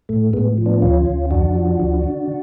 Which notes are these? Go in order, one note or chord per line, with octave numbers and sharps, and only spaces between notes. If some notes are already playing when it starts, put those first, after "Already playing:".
A2 A3
A2 G#3 B3
F3
B3 D4
D2 C#4 F4
D2
F2 D4 F#4
F3
D2
D3